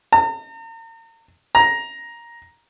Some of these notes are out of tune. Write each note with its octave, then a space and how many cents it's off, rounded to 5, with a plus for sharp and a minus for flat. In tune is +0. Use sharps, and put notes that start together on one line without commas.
A#5 -40
A#5 +10